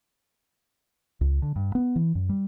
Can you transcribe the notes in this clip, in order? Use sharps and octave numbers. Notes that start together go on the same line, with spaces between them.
C#2
D3
G2
B3
E3
F#2
G3